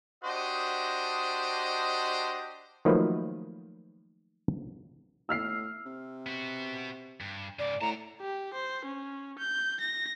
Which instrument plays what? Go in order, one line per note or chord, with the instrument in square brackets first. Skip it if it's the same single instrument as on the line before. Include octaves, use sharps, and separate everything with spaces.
[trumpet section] D4 F#4 G4 C5 D#5 D#6
[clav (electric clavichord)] D#3 F3 F#3 A3 A#3 B4
[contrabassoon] A2 [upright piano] E6 F6 C7
[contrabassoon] C3
[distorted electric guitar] B3 F#4
G2
[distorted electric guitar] G#2 C#3 [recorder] D5
[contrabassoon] A2 [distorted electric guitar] F#5 A5 [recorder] A#5
[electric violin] G4
C5
C#4
G6
A#6